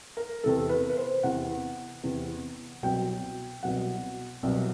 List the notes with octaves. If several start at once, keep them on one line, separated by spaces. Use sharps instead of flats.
A#4
E2 C3 E3 A4
B4
B4
C5
E2 C3 E3 F#5
E2 C3 E3
C2 B2 F#3 G5
C2 B2 F#3 F#5
C2 B2 F#3